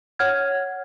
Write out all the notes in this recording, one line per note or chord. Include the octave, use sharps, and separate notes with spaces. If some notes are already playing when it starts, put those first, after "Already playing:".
C#5 F#5 F6 G#6